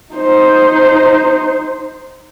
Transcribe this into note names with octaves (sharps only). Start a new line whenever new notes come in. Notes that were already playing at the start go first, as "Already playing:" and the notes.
D#4 C5